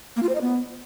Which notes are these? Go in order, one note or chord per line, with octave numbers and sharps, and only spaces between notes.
A#3
F4
C5
D#5
B3